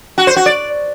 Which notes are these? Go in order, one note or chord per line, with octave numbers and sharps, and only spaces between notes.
F#4
C5
F#4
D5